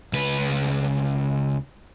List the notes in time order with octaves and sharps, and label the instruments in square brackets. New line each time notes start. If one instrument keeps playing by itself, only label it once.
[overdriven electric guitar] C#2 B4